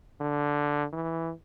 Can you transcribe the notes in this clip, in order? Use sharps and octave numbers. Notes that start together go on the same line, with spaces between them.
D3
E3